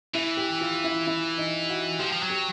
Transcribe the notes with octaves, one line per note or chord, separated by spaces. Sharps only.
E3 E4
G4
F4
E4
E4
D#4
F#4
F3 G4
F3
F#3
G4